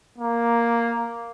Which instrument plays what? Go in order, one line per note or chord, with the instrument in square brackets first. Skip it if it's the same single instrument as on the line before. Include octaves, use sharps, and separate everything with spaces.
[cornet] A#3